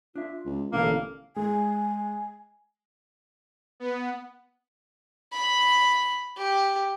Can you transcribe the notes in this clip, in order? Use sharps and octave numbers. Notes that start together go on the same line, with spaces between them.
D4 F4 E5
C#2
A1 B2 D3 A#3 D4 A4
G#3 G#5
B3
B5
G4